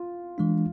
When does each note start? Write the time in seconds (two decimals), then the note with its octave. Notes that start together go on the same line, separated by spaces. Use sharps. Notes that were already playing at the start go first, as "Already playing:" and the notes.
Already playing: F4
0.38 E3 G#3 D4